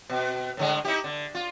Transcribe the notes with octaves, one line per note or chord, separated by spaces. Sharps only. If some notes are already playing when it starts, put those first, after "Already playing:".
B2
A2 D3 G#3
D#4 E4 G4
D3
F4